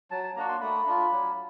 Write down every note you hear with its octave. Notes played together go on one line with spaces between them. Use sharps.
F#3 A5
A5
A#3 D4 F#4 A#5
C6
A3 B5
D4 F4
F#3